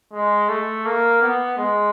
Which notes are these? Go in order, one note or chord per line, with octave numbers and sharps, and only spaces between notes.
G#3
A3
A#3
B3
G#3